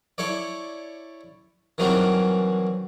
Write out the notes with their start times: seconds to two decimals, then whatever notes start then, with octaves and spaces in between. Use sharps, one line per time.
0.18 E4 A4 C#5 D5
1.78 D#3 E3 F#3 G3 C4 D4